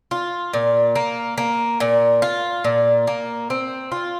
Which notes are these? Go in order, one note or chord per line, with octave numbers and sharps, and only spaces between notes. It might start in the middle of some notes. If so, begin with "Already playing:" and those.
F4
A#2
A#3
A#3
A#2
F4
A#2
A#3
C4
F4